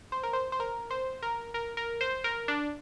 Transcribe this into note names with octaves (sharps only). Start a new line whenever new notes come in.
C5
A#4
C5
C5
A#4
C5
A#4
A#4
A#4
C5
A#4
D4